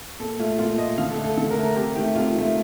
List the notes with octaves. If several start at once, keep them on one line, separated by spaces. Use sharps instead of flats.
A#2 A4
A3 F4
A#2 F4
A3 D#5
D3 F5
A4
A3
A4
D3 A4
A#4
A3
A#4
C3 G4
D#3 A3 G4
C3 F4
D#3 A3